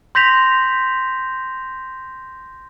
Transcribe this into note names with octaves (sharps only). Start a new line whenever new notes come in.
C6 G6 A#6 B6 F7